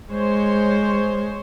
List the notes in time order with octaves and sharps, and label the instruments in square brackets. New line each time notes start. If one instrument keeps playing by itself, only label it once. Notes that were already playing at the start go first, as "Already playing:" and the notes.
[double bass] G#3 [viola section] C5 C#5